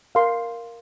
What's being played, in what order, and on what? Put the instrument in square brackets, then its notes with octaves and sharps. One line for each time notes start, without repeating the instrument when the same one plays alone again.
[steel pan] A#4 F5 C6